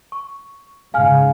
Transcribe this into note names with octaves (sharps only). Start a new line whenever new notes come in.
C#6
G#2 C#3 F5 G#5 F6